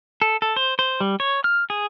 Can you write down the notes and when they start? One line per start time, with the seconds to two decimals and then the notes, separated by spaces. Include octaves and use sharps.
0.22 A4
0.42 A4
0.56 C5
0.79 C5
1.00 G3
1.20 C#5
1.44 F6
1.70 G#4